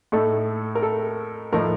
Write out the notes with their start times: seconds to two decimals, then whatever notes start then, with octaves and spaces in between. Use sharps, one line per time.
0.12 A2 A3 D#4 A4
0.75 A#4
0.82 A4
1.53 A2 F3 A3 D#4 A#4